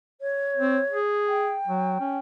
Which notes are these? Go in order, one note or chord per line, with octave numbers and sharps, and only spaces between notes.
C#5
C4
G#4
G5
F#3
C#4